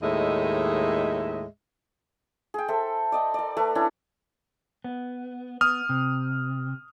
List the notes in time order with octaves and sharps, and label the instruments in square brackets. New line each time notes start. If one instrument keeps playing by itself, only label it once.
[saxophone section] D#2 A2 G#3 D#5 E5
[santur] G#4 G5
A4 C5 E5
D5 D#5 G5
A#4 D5
A3 A#4 B4
C#4 D4 E4
[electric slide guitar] B3
[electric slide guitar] B3 [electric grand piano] D#6 F6
[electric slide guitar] C3